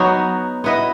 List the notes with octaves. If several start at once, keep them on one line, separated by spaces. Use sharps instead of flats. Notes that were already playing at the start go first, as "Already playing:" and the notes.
Already playing: F#3 B3 D#4 F#4
B3 E4 B4 D#5